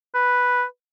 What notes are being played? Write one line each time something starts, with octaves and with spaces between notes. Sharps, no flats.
B4